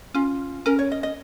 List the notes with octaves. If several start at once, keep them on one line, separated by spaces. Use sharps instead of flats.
C#4 F4
C#4 A#4
C#5
D#5
D#5